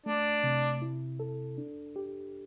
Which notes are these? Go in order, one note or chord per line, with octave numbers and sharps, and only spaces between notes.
A3 D4
C3
E4
A4
D4
G4